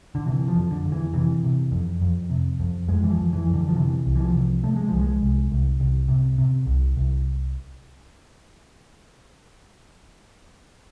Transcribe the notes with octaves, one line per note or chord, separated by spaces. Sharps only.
D3
C3 E3
F3
F2
D3
F2
E3
C3 E3
C3
F2
F2
C3
F2
F2 G#3
E3
F3
F2
E3
F2
D3
F3
C3 E3
C2
E3
F3
C3
C3 A3
G#3
C2 F3
G#3
C2
C2
C2
C3
C3
C2
C2